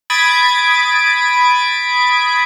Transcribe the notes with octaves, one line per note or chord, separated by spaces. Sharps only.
B5 D#6 G#6 A6 B6 D7